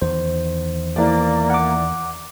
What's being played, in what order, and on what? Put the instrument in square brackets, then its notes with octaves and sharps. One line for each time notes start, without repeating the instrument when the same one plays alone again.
[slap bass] E2 D#3 [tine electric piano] C5
[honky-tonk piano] E3 D5 [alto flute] A#3
[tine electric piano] F#5 D6